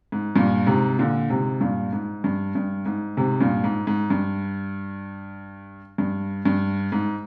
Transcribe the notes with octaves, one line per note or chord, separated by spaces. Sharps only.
G#2
G2 A#2
G#2 C3
A#2 D3
G#2 C3
G2 A#2
G#2
G2
G2
G#2
G#2 C3
G2 A#2
G#2
G#2
G2
G2
G2
G#2